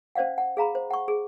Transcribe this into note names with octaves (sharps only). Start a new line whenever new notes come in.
C#4 C5 D5 F5 F#5
F#5
G#4 F5 A#5 B5
C5
F#5 C#6
G#4